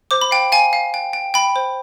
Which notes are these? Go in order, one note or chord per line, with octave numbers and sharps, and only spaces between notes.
C5 D6
B5
F5 G5
F5 G#5
F5
G5
G5
G5 B5
C5